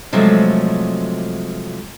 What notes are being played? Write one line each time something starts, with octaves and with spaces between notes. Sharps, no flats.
C3 F3 F#3 G#3 A3